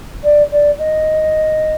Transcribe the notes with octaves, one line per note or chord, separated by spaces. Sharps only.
D5
D5
D#5